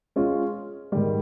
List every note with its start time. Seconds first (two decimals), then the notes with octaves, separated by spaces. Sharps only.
0.16 G#3 C#4 F4
0.92 G#2 D#3 G3